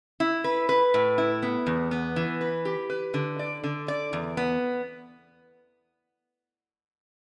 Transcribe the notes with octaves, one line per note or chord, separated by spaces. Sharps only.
E4
B4
B4
A2
E4
B3
E2
B3
E3
B4
G4
B4
D3
D5
D3
D5
E2
B3